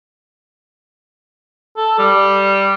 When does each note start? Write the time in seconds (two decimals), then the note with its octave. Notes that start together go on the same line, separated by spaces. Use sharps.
1.77 A4
1.98 G3